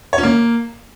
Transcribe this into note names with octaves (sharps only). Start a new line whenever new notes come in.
C#5
C#4
A#3